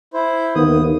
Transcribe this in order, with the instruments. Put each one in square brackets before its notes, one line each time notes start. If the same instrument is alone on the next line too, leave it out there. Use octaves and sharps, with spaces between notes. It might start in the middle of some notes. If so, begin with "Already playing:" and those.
[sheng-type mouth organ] E4 C5
[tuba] D#2 [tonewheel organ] D#3 A#3 B3 [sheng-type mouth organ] D#6